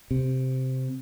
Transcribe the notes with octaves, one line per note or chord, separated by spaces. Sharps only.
C3